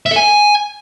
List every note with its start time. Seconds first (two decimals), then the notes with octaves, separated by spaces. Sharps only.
0.06 E5
0.11 A4
0.16 G#5